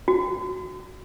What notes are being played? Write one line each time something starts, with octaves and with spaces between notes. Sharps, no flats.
F#4